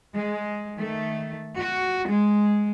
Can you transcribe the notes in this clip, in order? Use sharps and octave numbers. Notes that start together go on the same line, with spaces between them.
G#3
D#3 A3
F#4
G#3